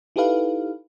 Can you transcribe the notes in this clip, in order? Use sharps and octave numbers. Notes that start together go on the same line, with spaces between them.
D#4 E4 G4 A4 B4 F5